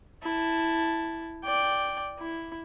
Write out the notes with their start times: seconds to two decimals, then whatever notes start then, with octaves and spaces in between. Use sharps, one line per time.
0.23 E4 A5
1.44 D5 G5
2.19 E4